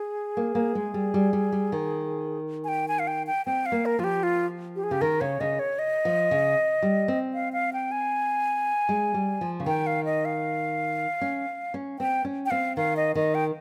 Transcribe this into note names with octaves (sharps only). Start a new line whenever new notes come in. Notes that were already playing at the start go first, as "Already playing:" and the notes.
Already playing: G#4
A#3
A#3
G#3
G3
G3
G3
G3
D#3
G#5
G5
G#5
F5
G5
G5
C4 G5
F5
A#3
A#4
F3 F4
G4
F4
G4
G#4
C#3 G4
D#3 A#4
C#3 C#5
C#3 D#5
C#5
D#5
F3
C#3
G3
C4
F5
F5
G5
G#5
G#3
G3
F3
C#3
D#3 G5
F5
D#5
F5
C#4
C#4
C4 G5
C#4
G5
C4 F5
D#3 F5
D#5
D#3 D#5
G5